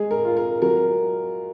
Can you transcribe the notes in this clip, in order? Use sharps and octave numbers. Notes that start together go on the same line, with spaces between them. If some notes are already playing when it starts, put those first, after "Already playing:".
Already playing: G#3 G#4
A#4
F4
A#4
F#3 A#4